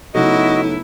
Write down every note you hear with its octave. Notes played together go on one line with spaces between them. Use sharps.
C#3 F#3 A3 B3 D#4 E4 F#4 D#5